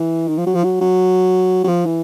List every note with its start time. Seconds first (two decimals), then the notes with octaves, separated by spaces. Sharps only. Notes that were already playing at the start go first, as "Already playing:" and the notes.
Already playing: E3
0.28 D#3
0.38 F3
0.46 F#3
0.55 F3
0.64 F#3
0.81 F#3
1.64 F#3
1.68 F3
1.86 E3